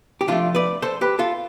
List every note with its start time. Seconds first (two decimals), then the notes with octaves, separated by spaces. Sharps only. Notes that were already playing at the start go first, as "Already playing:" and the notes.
0.21 G4
0.27 C3 F3 A3 D4 F4
0.55 B4 D5
0.82 A4 C5
1.01 G4 B4
1.19 F4 A4